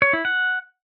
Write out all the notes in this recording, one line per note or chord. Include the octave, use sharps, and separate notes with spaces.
C#5
E4
F#5